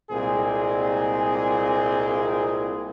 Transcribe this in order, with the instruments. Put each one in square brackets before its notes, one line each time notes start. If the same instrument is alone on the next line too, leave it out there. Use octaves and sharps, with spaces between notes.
[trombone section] C2 A#2 G#3 C4 G#4